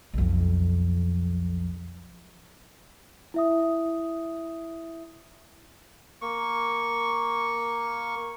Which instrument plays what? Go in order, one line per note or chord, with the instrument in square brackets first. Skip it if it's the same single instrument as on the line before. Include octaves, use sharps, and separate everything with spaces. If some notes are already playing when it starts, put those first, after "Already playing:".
[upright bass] B1 F2
[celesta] E4 E5 D#6
[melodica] A#3 C#6